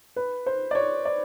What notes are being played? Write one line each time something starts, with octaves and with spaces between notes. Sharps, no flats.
B4
C5
D5
C#5
D5